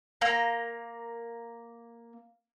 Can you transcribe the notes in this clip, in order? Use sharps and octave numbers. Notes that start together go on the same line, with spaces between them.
A#3 A#5